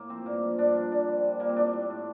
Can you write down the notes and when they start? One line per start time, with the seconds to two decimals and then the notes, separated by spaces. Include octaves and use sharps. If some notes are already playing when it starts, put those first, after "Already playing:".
Already playing: A2 A#3
0.09 F3 C4
0.26 G2 A#3
0.43 F3
0.58 G2 D4
0.75 F3
0.91 A#2 D4
1.08 G3
1.24 A#2
1.40 G3 A#3
1.49 C4
1.56 A2 D4
1.73 G3
1.90 A2